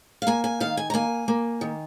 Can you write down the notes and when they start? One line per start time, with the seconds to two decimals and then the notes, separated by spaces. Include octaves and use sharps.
0.22 F5
0.27 A#3 G#5
0.44 G#5
0.60 D#3 F5
0.77 G#5
0.90 A#5
0.94 A#3 G#5
1.28 A#3
1.61 D#3